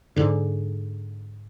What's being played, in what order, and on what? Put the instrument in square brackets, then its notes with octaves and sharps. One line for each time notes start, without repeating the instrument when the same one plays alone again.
[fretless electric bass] G#2 D3